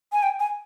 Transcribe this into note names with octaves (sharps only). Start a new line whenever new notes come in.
G#5
G5
G#5